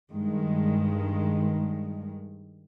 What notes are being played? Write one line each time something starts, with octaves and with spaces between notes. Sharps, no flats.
G2 D#3 G#3